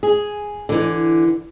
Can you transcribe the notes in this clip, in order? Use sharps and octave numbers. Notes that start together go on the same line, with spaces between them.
G#4
D3 E3